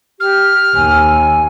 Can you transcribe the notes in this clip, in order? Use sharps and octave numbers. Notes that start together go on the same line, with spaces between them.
G4 F6
D#2 G#5